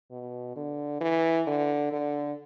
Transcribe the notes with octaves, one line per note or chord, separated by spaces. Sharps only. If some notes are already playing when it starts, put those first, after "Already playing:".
B2
D3
E3
D3
D3